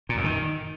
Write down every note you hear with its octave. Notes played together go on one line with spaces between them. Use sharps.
A#2
F#2
D#3